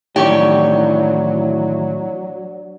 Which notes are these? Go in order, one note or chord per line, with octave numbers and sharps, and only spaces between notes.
A2 D#3 E3 F#3 D4 G4 C#5 D5